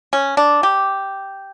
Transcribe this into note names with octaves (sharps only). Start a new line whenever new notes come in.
C#4
D4
G4